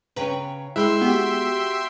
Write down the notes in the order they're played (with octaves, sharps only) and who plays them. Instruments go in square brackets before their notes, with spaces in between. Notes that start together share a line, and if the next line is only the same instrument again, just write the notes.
[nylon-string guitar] C#3 C#4 [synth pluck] B4 G5 A#5
[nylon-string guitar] G#3 [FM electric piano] E4 E6 [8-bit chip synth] E5 G5 C6 [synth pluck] B5 F#6
[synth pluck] B3 [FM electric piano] F#4 G4